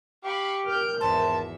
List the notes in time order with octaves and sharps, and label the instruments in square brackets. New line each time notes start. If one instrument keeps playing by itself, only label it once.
[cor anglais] G4 [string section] F5 B5 C#6
[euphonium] A#4 [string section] F6 G6
[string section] G#1 E2 E5 [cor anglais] C5 [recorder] A5